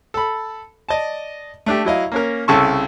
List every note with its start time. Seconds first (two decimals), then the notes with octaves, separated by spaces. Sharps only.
0.14 A4 B5
0.89 D5 D#5 A5
1.66 A3 D4 G4
1.85 F#3 E4 D#5 F5
2.12 A#3 C#4 A#4
2.48 C2 C#3 A4 A5 C#6